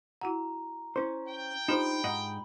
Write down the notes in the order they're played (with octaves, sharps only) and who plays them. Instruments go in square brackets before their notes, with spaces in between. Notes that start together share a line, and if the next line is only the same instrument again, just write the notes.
[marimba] E4 F#4 F#5 [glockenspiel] A#5
[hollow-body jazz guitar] C#4 C5 [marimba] E4
[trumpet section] G5
[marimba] D4 F4 G4 [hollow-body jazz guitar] D#4 C5 [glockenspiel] B5
[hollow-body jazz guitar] G#2 D#5 F#5 [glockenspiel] F#7